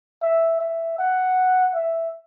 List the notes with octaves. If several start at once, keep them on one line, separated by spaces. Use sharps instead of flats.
E5
E5
F#5
E5